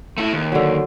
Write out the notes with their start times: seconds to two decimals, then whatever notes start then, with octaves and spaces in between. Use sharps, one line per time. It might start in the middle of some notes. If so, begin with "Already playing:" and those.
0.18 A3 E4
0.33 D#2
0.52 D3 F#3